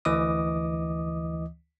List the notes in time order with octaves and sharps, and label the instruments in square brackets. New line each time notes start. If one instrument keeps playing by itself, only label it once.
[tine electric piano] D2 E3 D#5 D6 D#6